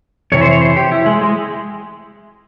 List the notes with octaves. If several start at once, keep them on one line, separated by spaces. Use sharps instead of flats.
F2 C3 E3 C#5
C5
C#5
C5
G4
E4
G#3
G#3